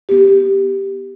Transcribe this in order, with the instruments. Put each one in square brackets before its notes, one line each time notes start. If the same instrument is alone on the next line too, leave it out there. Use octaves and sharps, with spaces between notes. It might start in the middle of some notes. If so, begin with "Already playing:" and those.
[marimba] B3 G4